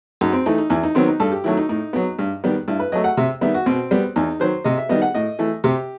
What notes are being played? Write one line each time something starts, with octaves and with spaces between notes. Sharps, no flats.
F#2 D#4
C4
E3 A3 D#4
D#4
E2 E4
D#4
D#3 F#3 B3 C4
D#4
G2 A4
G4
D#3 F#3 A3 E4
D#4
A2 D#4
F#3 B3
G2
D#3 G3 B3
G2 E4
B4
F#3 A3 D#5
F#5
C3 E5
D#3 G3 B3 E5
F#4
B2 C4
G3 B3
E2 D#4
D#3 F#3 C5
C3 D#5
E5
D#3 G3 B3 D#5
F#5
A2 D#5
E3 A3
C3 G4